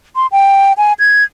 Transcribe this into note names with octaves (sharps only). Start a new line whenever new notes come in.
C6
G5
G#5
G#6